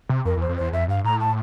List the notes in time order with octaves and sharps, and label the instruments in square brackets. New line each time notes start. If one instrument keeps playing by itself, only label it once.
[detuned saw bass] C3
[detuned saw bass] F2 [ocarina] A#4
[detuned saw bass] E2
[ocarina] C5
[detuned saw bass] F2
[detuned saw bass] E2 [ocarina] C5
[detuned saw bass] F2 [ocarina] E5
[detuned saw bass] G2 [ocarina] F5
[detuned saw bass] A2 [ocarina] A#5
[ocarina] A5